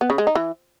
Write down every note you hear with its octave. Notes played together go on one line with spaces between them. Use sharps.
B3
C#3
G#3
D#4
E3